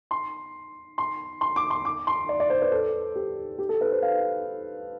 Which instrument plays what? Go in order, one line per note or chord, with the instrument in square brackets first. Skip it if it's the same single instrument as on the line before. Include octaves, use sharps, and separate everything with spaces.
[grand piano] C6
C6
C6
D6
C6
D6
C6
D5
D5
C5
B4
A4
G4
G4
A4
B4
C5
F5